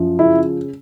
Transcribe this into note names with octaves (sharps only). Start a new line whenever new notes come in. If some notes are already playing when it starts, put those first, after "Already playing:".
Already playing: F#2 F3
C#3 E4